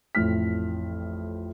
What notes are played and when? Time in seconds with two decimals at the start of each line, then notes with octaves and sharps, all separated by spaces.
0.15 A1 F2 A2 F6 B6